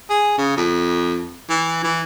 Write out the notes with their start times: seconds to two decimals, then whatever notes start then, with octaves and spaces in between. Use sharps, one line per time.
0.10 G#4
0.38 C#3
0.57 F2
1.49 E3
1.84 E3